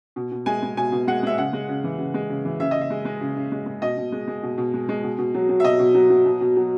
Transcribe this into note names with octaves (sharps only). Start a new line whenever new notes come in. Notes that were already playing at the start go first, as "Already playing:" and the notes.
B2
B2
G#3 G#5
G#3
B2 G#5
B2
G#3 F#5
G#3 E5
C#3 F#5
G#3
C#3
E3
C#3
G#3
C#3
E3
C#3 E5
C#3 D#5
E5
G#3
G#3
C#3
C#3
G#3
G#3
B2 D#5
B2
G#3
G#3
B2
B2
G#3
G#3
B2
B2
F#3
F#3
E5
B2 D#5
B2
F#3
F#3
B2
B2
F#3